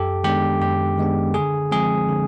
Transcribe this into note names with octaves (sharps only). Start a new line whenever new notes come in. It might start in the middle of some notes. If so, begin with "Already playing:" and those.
Already playing: F#2 G4 A4
D#3 G#3 B3 D4 G4
F#2 G4
D#3 G#3 B3 D4
D3 G#4
F3 G#3 C4 G#4
D3